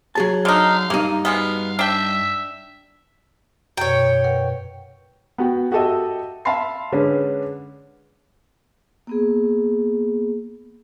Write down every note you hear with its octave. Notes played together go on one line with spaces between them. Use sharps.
F#3 G#4 A5
D3 D#4 F5
G2 A#3 D#4
B2 G#3 B3 F5
D4 E5 G5
F#2 B2 C#5 G5
A#4 B4 F#5
B3 F#4 G5
F#4 G4 A4 D#5 E5
E5 F5 A5 B5 C6 C7
D3 G#3 C#4 D4 B4
A#3 B3 G#4